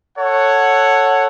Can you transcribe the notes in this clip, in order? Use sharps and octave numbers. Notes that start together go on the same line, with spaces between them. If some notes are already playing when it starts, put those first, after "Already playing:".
A4 C#5 F#5